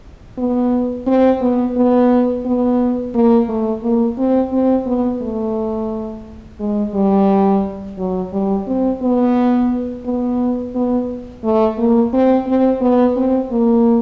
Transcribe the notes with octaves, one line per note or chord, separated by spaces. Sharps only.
B3
C4
B3
B3
B3
A#3
A3
A#3
C4
C4
B3
A3
G#3
G3
F#3
G3
C4
B3
B3
B3
A3
A#3
C4
C4
B3
C4
A#3